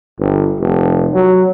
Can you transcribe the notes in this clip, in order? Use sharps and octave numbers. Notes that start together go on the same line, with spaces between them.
G1
F1
F#3